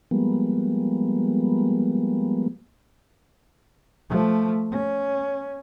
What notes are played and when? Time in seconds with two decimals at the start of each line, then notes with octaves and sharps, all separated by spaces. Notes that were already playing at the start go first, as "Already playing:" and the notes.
0.11 F3 G3 G#3 A#3 B3
4.09 F3 A3
4.72 C#4